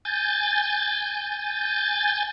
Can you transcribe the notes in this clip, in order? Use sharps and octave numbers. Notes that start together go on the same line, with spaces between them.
G#5 G6 A6